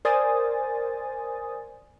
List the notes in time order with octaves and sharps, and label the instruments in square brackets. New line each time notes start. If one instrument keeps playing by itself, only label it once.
[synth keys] A#4 C5 D5 G#5 D#6 A6